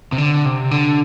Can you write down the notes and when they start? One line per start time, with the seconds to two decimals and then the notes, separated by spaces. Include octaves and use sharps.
0.12 C3
0.18 D3
0.45 C3
0.71 D3